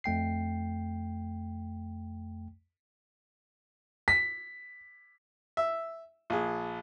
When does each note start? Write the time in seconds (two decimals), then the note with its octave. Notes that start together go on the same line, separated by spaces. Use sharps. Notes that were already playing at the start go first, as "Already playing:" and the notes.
0.04 F2 A3 G5 C7
4.08 B6
5.57 E5
6.30 A#1 G#4